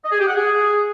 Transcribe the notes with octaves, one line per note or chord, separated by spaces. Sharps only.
D#5
G#4
G4
F#5
G#4